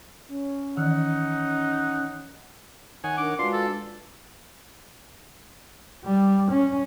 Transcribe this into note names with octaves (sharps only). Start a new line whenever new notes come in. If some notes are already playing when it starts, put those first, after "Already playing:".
C#4
D#3 E3 D#4 F#5
D#3 C#5 F#5 G#5
D4 A#4 D6
G#3 D4 F4 F#4 B4 C6
A4
G3
C#4